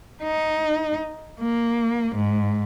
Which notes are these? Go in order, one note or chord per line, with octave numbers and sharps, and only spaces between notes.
D#4
A#3
G#2